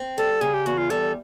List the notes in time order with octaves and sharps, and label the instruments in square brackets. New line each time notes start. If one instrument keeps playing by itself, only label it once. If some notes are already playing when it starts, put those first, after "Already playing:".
Already playing: [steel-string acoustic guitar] C4
[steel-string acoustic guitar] G3 [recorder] A4
[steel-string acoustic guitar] C#3 [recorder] G#4
[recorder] G4
[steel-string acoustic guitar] E2 [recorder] F#4
[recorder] F4
[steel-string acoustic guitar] G3 [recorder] A4